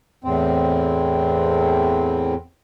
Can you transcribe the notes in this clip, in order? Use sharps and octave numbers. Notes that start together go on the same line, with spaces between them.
E2 A2 C4